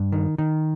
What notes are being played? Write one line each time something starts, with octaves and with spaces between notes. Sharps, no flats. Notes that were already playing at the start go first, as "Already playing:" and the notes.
Already playing: G2
D#3
D#3